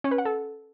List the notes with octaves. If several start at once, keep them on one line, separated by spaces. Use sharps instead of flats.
C#4
B4
F#5
A4